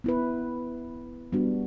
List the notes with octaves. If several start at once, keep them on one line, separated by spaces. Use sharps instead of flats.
B3 E4 B4
G3 B3 D4 F#4